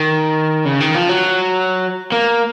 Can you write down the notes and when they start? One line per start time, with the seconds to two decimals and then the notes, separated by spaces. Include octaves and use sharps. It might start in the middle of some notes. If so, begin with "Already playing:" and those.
Already playing: D#3
0.65 C#3
0.80 D#3
0.95 F3
1.09 F#3
2.12 A#3